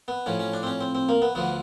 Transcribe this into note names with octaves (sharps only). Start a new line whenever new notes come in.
B3
A2 F3 C#4
C#4
D4
C4
C#4
C4
C4
A#3
B3
D2 D3 F3 B3